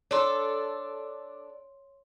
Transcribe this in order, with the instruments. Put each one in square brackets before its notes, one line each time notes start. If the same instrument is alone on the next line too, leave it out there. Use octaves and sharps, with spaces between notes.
[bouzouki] D4 A4 [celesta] C#5 C6